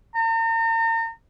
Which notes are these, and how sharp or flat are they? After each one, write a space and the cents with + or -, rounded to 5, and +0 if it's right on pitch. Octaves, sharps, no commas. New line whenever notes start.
A#5 -40